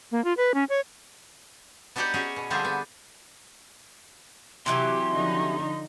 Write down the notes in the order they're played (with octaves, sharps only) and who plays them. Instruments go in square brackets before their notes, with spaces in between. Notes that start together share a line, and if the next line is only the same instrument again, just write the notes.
[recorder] A#3
F4
B4
C#4
C#5
[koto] B3 D4 D#4 G4 D5 F#5
C#4 F#4 G#4 C#5 D5
B2
D3 F3 G3 C4 D4 G#4
B3
[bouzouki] C3 E3 F#3 [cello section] G4 [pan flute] C6
[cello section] D3 F3 D#4